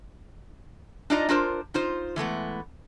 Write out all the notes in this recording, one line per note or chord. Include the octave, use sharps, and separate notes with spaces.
D4 D#4 F4 D5 D#5 A#5
D4 F4 A#4 C5
D#4 F4 C5
E3 G#3 A3 B3